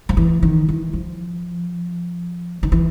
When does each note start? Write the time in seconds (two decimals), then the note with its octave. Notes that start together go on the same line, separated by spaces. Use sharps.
0.09 F3
0.17 E3
0.43 D#3
0.69 E3
0.93 F3
2.63 D#3
2.72 E3